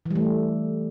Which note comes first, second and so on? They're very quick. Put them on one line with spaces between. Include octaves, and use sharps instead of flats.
E3 G3 A3